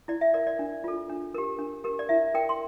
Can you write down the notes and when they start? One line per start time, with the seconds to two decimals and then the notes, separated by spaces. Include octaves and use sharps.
0.08 E4 D5
0.21 E5
0.34 A#4 D5
0.47 D5
0.59 D4
0.84 F4 A4
1.10 D4
1.34 G4 A#4
1.58 D4
1.84 G4 A#4
1.99 D5
2.09 E4 E5
2.34 A#4 G5
2.49 C6